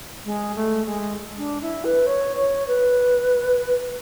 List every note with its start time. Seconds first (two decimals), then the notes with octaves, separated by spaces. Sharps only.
0.25 G#3
0.55 A3
0.86 G#3
1.38 D4
1.62 E4
1.84 B4
2.07 C#5
2.36 C#5
2.67 B4